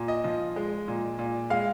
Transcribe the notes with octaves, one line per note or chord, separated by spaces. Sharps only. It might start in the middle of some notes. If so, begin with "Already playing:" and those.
Already playing: A#2
D#5
F3
G#3
A#2
A#2
G#3 F5